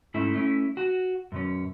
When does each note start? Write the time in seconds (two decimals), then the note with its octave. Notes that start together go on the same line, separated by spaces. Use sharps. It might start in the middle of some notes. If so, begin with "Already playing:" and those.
0.14 G#2 A3 C#4 E4 E5
0.33 A3 C#4 E4
0.77 F#4
1.32 F#2 B2 C#4